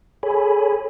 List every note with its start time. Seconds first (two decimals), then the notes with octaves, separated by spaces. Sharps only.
0.23 G#4 A4 C#5 G#5 B5